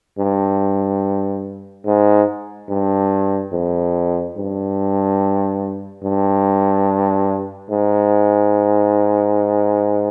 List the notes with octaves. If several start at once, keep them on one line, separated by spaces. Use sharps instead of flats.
G2
G#2
G2
F2
G2
G2
G#2